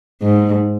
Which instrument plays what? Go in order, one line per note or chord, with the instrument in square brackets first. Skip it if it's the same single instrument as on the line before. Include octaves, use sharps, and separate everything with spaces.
[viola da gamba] G#2